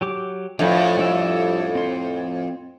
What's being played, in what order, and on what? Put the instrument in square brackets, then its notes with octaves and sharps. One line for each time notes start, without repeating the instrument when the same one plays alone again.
[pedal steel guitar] F#3 G4 D6
[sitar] F2 A2 [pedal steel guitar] D4 B4
[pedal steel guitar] G3 D4 E5
C4 C6